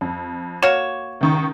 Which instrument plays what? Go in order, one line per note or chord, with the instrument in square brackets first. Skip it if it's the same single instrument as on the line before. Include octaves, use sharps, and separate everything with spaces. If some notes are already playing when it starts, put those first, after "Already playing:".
[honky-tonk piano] F2
[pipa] A#3 F#4 C#5 [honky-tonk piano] E7
[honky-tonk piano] C#2 D#3 C#6